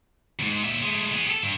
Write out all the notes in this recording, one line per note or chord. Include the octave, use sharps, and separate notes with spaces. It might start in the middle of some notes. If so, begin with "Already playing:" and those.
E2 G#2
A#2 E5
G#3 A3
B3 G#4
G4 A4
G2